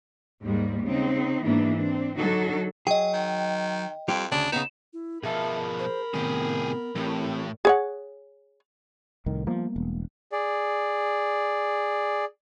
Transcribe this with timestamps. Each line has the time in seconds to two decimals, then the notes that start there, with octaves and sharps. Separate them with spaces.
0.43 D#2 G#2 G3 G#3 A#3
0.86 C#3 C4 D#4
1.45 G#2 E3 A#3 B3 D4
1.78 C4 D4
2.17 D3 F#3 D#4 F#4 A4
2.87 F#3 G#4 D#5 G5
3.13 D#3
4.08 F2 G3 F4 G4
4.32 D2 C#3 D4
4.52 C#3 B3 D#4 E7
4.93 E4
5.23 B2 F3 G#4 A#4 E5 A5 B5
5.79 C5
6.14 A2 C3 D#3 B3 G4 G#4
6.95 A2 E3 A3 C4 G4
7.65 G#4 C#5 F#5
9.26 C2 A2 D#3
9.47 F3 G3 A#3 B3
9.76 E1
10.32 G#4 D5